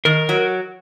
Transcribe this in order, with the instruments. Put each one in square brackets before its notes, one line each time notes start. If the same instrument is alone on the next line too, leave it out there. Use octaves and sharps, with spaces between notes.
[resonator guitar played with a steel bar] D#3 [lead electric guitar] A#4
[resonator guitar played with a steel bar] F#3